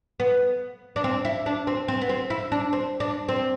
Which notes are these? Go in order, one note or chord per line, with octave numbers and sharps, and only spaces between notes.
B3
D4
C4
E4
D4
C4
C4
B3
C4
E4
D4
C4
D4
C4